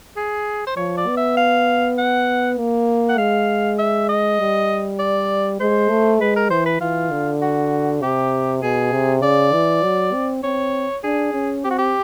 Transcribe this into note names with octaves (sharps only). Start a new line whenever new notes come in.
G#4
C5
F3 C#5
D5
B3
E5
F5
F#5
A#3
F#5
G#3 F5
E5
D#5
G3
D5
G#3 C5
A3
G#3 B4
A#4
E3 C5
B4
E3 F4
D3
F#4
C3 G4
B2 G#4
C3
C#3 D5
E3
F#3
C4
C4 C#5
D4 G#4
C#4
C4 G4
F#4
G4